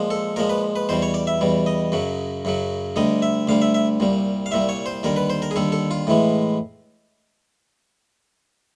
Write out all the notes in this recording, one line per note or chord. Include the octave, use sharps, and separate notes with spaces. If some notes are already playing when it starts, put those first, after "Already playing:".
Already playing: A#2 F3 G#3
A4
A#2 F3 G#3 A#4
B4
B4
E2 B2 G3 C5
C#5
D5
E5
E2 B2 G3
D#5
F#2 C#3 F#3
F#2 C#3 F#3
D2 D3 G3 D#5
E5
D2 D3 G3 F5
E5
E5
C2 A#2 G3
F5
C2 A#2 G3 E5
C#5
C5
D#2 D3 G3 A#4
B4
C5
A#4
G#4
D#2 D3 G3 A4
A4
F4
A2 E3 G#3